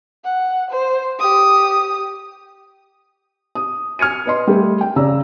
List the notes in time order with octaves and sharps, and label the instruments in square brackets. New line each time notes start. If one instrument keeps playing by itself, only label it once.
[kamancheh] F#5
C5
G4 D#6
[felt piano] D#6
G#5 F6 G#6 C#7 D#7
B4 D#5 C6
G3 A3
G5
C#3 D5 A#5 E6